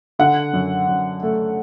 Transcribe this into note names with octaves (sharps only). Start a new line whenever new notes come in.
D3 F#5
F#2
F#2
A3